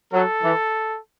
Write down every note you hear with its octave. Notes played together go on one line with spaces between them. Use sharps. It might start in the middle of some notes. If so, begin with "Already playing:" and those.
F#3 A4
E3